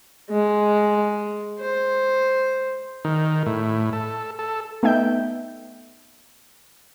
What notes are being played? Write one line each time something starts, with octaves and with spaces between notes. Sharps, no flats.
G#3
C5
D#3
A2
A4
A4
A3 B3 D#4 E5 G5 G6